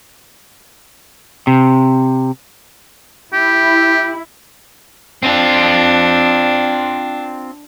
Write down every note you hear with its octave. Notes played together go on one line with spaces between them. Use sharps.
C3
E4 G4
C4 D4 F4